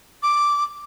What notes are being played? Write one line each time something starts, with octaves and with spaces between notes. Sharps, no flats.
D6